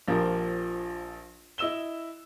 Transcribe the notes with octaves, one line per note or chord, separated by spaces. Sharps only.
A#1 F3 G4 A#4
E4 D#5 E6 E7 G7